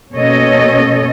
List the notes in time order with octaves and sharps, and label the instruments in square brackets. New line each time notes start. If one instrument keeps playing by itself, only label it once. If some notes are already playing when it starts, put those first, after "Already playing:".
[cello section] B2 A#3 C#4 A4 C#5 D#5